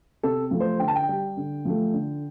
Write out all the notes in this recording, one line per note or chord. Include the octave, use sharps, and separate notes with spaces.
C3 A4
F3 A3
C5
D3 G5
A5
G5
G3
D3
F3 A3
D3